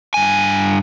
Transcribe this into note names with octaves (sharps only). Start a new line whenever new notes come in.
G2 G#5